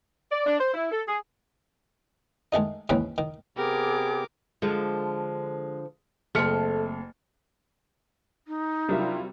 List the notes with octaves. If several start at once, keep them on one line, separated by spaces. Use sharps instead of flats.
D5
D4
C5
E4
A4
G#4
D#3 G#3 A3 D#4
D#2 G#2 E3 C#4 G5 B5
D#3
C3 B3 G4 G#4 A#4 D6
D3 F3 G#3
F#1 A3 C4 F6 C#7
D#4
C3 F#3 G3 D4 E4 F4 A#4 E5